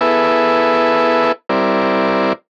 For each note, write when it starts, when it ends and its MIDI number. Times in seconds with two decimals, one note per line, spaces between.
0.01 1.32 59
0.01 1.32 64
0.01 1.32 68
0.01 1.32 69
0.01 1.32 71
0.01 1.32 76
1.49 2.33 55
1.49 2.33 60
1.49 2.33 64
1.49 2.33 70
1.49 2.33 74